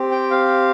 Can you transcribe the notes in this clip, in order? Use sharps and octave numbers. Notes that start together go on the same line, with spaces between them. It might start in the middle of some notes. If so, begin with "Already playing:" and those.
Already playing: C4 G4
G5
F5